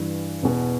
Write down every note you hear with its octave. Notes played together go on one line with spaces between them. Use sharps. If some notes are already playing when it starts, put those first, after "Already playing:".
Already playing: G2 E3
E2 B2